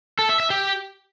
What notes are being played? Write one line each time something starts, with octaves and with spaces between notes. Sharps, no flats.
A4
E5
E5
G4